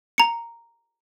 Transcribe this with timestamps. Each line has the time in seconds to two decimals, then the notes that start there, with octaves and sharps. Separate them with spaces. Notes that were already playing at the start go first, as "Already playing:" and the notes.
0.18 A#5 C#7